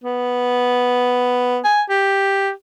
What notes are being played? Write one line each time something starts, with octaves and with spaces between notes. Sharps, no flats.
B3
G#5
G4